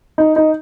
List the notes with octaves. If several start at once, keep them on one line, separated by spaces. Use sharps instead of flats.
D#4
D#4